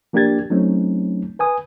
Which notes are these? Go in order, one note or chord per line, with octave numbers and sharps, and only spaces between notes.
F3 A#3 D4 G4 G#6 A6
F#3 A3 C4 C#4 D#4
B4 G#5 D#6